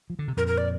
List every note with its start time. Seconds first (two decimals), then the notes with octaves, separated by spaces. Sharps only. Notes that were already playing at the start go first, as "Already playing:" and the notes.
0.10 F3
0.19 D3
0.28 C3
0.37 F2 A#2 A#4
0.47 A#4
0.58 D5